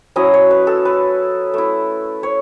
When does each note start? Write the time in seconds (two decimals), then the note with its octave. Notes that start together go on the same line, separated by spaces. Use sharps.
0.16 F#3 C#4 E4 D#5
0.34 C#5
0.51 B4
0.67 A4
0.85 B4
1.54 A3 E4
2.23 C#5